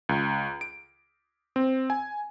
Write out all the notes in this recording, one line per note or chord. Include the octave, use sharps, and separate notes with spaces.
C#2
D7
C4
G#5